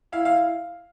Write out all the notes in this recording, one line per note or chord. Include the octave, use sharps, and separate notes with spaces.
E4 F5
F5